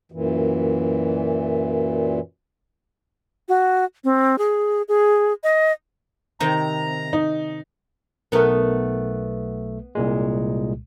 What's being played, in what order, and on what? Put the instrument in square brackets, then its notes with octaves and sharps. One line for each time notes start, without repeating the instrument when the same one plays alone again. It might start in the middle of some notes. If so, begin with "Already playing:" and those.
[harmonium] F#2 A#2 E3
[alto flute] F#4
C4
G#4
G#4
D#5
[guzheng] C3 D#3 C4 [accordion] A#5
[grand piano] D#4
[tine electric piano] B1 A3 [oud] B3 A#4
[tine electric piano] C2 A#2 G#3